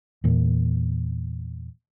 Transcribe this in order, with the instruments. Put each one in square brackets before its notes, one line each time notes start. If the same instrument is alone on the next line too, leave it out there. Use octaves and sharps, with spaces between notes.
[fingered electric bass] E2 A#2